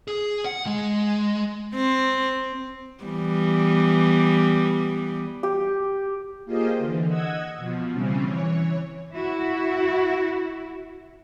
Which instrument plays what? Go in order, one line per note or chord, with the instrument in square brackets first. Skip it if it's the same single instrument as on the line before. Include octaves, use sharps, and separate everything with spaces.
[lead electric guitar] G#4
F#5
G#3
[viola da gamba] C4
E3 G3 B3
[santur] G4
[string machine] A#3 F4 G4 G#4 C5 D#5
D3 E3
D#5 F#5 E6 G#6
B2 F3
C#3 E3 G3 C4 C#4
E3 C#5
[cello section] E4 F#4